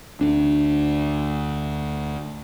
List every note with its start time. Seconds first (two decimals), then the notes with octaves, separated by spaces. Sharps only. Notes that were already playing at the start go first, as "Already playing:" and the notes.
0.21 D2 D4